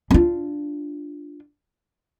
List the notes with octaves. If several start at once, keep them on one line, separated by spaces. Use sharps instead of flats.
D4 F4